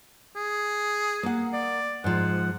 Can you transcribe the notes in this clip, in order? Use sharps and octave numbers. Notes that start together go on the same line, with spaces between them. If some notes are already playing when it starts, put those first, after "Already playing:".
G#4
A#3 F#5
D5
G#2 F3 F#5